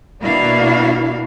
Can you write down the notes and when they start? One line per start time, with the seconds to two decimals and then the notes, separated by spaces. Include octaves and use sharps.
0.22 B2 A#3 D4 E4 F#4 F5